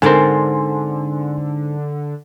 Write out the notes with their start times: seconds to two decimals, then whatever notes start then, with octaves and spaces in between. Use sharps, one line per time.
0.02 G#2 D3 C4 D4 A4 A#4 G#5 C6